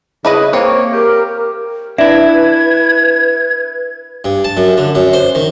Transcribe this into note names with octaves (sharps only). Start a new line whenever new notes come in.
C#3 E4 B4 D#5
A#3 C4 C#5
G4 A#4
D4 E4 B4 E5 G#6
G2
A5
F#2
D3
F#2
C5
D#3